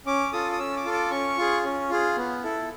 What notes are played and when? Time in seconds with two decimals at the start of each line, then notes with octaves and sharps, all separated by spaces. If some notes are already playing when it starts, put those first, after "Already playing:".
0.06 C#4 D6
0.33 F4 A4 D#6
0.52 D#6
0.59 C#4 E6
0.76 D6
0.85 F4 A4
0.93 D6
1.11 C#4 C#6
1.38 F4 G#4
1.64 C#4
1.90 F4 G#4
2.17 B3
2.43 E4 A4